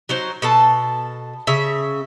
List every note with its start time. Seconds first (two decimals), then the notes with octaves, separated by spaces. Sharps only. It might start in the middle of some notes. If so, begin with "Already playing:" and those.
0.09 F#3 D#4 C5
0.42 B2 A4 A5
1.47 C#3 E5